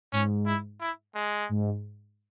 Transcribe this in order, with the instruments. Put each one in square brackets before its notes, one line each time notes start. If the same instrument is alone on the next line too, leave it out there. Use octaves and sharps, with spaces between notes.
[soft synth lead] G#2 [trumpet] C#4
[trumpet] E4
E4
G#3
[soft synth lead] G#2